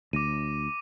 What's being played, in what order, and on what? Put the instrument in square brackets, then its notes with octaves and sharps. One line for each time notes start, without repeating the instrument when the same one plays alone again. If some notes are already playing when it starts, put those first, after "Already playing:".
[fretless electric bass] D2 [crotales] D6 A#6 D#7